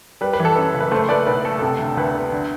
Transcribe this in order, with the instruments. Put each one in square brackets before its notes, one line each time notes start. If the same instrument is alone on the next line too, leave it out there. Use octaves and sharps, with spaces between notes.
[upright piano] G3 B4
B4
E3
A4
F#2 A4
F#1
B4
A3 A4 C5
A3 B4 D5
B1 B4
A3 A4
C3 A4
D2
D2 B4
B3
D3